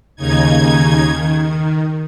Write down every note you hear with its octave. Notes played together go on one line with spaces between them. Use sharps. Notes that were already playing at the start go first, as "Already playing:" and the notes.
D#2 C#3 D#4 G#6
D#3